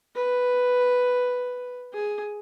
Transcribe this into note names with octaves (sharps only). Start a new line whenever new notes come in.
B4
G#4